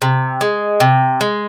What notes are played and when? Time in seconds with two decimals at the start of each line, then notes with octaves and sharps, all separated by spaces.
0.02 C3
0.41 G#3
0.80 C3
1.21 G#3